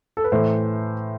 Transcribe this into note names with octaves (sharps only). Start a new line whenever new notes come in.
A4
B4
A2 E3 A3 C5